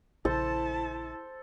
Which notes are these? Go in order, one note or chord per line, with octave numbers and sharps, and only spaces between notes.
A#1 C#3 E4 A4 C5 A5